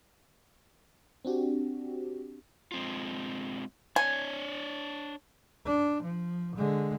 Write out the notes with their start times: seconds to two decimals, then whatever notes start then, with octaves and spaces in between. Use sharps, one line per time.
1.25 C4 D4 F#4 G4
2.72 G#3 C4 F4
3.96 D4 C#5 G#5
5.66 D4
6.03 F3
6.56 D3 G#3